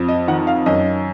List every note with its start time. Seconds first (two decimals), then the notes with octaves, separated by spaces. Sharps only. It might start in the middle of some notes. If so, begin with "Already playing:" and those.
Already playing: F2
0.08 D#5
0.28 D#3 F#5
0.47 F5
0.66 F#2 D#5